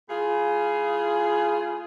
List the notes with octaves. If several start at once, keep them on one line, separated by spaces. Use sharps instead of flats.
A2 F4 G#4